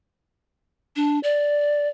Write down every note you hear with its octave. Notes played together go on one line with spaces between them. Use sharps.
D4
D5